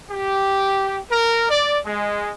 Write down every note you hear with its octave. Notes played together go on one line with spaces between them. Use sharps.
G4
A#4
D5
G#3